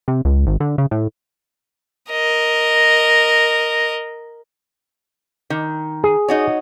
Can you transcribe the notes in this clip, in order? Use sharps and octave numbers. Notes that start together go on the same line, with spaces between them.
C3
C#2
G#1
D3
C#3
A2
A#4 D#5
D#3
G#4
D#4 F#4 C#5